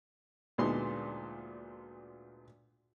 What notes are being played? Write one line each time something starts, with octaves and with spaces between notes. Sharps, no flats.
D2 A#2 G#3 B3 D#4 C6